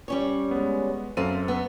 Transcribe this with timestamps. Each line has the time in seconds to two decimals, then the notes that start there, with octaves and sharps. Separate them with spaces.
0.08 G3 C#4 C#5
0.51 G#3 B3
1.17 F#2 C4 A4 F5 D#7
1.48 B3